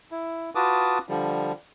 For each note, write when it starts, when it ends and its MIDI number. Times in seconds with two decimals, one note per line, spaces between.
0.11 0.50 64
0.55 0.98 65
0.55 0.98 66
0.55 0.98 71
0.55 0.98 81
0.55 0.98 86
0.55 0.98 87
1.09 1.52 50
1.09 1.52 53
1.09 1.52 55